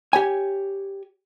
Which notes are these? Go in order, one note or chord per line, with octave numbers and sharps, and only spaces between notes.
G4 C#5 G#5